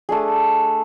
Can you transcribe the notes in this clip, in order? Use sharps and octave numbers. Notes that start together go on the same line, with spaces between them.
A3 D4 G#4